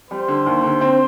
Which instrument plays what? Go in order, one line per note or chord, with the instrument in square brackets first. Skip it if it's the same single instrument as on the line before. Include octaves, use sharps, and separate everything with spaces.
[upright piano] G3 [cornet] C5
[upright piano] D3
D#2
D3
C4